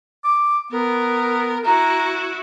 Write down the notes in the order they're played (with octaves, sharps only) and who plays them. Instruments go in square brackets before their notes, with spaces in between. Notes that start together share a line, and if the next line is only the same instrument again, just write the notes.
[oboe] D6
[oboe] B3 [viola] A#4
[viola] E4 F#4 [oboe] A#5